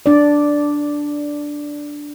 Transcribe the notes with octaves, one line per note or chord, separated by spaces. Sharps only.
D4 D5